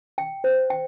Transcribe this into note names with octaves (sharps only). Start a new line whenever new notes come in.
G5
C5
G5